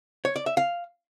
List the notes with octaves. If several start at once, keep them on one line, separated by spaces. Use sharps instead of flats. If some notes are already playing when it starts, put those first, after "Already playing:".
C#5
D5
E5
F5